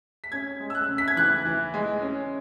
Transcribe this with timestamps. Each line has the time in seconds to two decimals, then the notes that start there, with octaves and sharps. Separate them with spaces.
0.24 B6
0.32 C#4 G#6
0.60 G#3
0.70 E6
0.75 F#6
0.89 C#3
0.98 B6
1.08 G#6
1.16 E3 F#6
1.45 E3
1.74 G#3
2.02 C#4